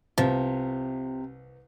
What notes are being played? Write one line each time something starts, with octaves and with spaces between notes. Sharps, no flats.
C2 C3 F3 B3